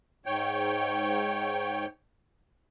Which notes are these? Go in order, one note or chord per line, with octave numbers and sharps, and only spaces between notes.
G#2 C#5 G5